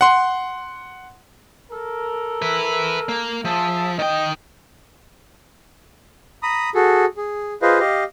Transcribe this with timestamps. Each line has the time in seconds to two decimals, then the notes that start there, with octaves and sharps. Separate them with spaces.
0.01 F#5 C6
1.71 A4 A#4
2.42 B4 E5
3.09 A#3
3.45 F3 G#4 E5 A5
3.99 D#3 D#5 G5
6.43 A#5 B5 D#6
6.75 F#4 G#4 A4
7.17 G#4
7.62 F4 G#4 B4 C5 D#5 F5
7.80 G4 D#5 F5